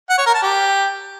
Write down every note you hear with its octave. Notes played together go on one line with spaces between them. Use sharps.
F#5
C#5
A#4
A5
G4